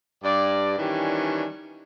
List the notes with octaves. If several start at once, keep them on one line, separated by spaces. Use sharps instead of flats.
G2 D5
D#3 E3 G3 C#4 D4